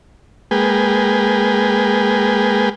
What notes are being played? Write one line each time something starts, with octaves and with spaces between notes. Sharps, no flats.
G#3 A#3 G#4 B4 G5